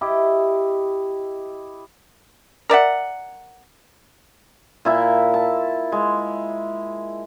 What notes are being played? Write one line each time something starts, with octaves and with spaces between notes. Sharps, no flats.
E4 G4 D#5
A#4 D5 E5 F#5
A#2 E4 E5
A5
G#3